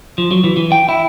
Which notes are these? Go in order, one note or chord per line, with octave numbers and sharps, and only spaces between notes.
F3
F#3
E3
E3
G5
E4